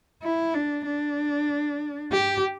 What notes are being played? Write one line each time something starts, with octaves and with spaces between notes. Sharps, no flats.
E4
D4
D4
G4